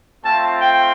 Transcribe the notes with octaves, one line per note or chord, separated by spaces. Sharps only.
A3 C4 F4 A5
G5